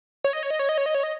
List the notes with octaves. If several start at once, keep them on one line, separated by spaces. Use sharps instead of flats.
C#5
D#5
C#5
D#5
C#5
D#5
C#5
D#5
C#5
D#5